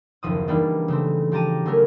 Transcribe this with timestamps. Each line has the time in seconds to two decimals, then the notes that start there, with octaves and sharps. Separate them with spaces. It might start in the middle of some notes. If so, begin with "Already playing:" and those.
0.23 F#1 D#2 F3 D#6
0.48 E3 G3 A#3 D4 D#4
0.88 C#3 A3 C4
1.32 F3 G4 A5 A#5 D#7
1.66 C#3 E3 F#3 A3 C#4 A#4